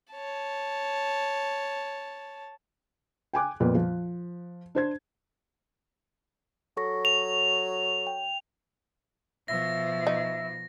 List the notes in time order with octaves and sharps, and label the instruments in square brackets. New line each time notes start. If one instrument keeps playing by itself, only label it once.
[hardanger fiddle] C#5 A5
[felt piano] G5 G#5 D6 F#6
F2 A#2 B3
F3
D4 C5 G#6
[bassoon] F#3 [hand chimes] A4 C#6 A#6
[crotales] F7
[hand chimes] G5
[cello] B2 F3 [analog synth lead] E5 [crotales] A#6
[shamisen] D#4